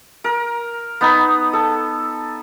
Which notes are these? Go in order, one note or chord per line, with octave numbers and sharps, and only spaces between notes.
A#4
B3 D#4 B5
A4